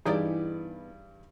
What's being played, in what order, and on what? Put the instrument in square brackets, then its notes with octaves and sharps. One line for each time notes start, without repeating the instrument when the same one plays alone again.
[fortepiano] G2 D5 [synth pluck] E3 D#4 G#4 [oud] B3 E4 G4